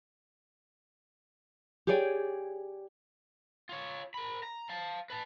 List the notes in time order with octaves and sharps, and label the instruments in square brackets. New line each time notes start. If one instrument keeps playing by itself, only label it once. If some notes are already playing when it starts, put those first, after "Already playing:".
[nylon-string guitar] G4 G#4 C#5 D5 G5 G#5
[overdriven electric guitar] F4 C#5
A#4 B5
A#5
F5 A5
B4 A5